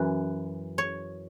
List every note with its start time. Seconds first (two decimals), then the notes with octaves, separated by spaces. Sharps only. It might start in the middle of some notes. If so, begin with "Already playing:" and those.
Already playing: F#2 E3 B4
0.78 C#5